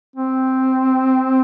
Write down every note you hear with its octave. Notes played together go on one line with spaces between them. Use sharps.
C4